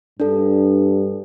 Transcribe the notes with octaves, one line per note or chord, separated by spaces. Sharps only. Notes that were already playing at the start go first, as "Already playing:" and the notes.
G2 D4 A4